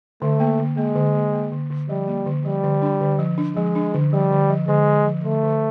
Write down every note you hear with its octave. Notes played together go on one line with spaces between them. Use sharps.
D3 A3
A#3
D3
G#3 A#3
D3
A#3
A#3
D3
D3
F3 G3
A#3
D3
F3 G3
D3
D4
D3
F3
D4
F3 G#3
D4
D3
F3 G3
D3
F3
D3 G#3
D3
F3
D3 A3
D3